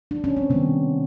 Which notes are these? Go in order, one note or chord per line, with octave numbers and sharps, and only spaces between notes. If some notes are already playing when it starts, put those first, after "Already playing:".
D4
C#4
C4
C3 D#3 G3 B3